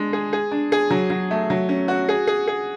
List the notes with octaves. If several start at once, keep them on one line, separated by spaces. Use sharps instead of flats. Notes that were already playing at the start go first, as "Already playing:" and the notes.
Already playing: G#3 D4
G#4
G#4
D4
G#4
F#3
F#3
A3
F#3
C#4
F#4
G#4
G#4
G#4